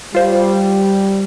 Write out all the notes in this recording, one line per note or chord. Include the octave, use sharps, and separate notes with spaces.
G3 F4 C5